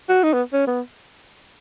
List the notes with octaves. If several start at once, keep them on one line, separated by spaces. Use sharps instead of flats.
F#4
D#4
B3
C#4
B3